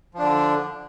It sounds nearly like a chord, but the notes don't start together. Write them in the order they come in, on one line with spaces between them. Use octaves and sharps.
F3 D4 D3